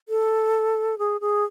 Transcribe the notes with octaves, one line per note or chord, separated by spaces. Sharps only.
A4
G#4
G#4